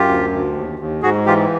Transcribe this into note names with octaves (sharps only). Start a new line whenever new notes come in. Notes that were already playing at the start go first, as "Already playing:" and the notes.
Already playing: F#2 F4 G4
D2
D2
D#2
D#2
G#2 F#4 G#4
E3 F4 G4